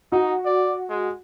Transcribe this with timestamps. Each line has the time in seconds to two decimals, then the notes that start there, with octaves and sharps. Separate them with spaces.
0.12 D#4 F#4
0.45 D5
0.90 G#3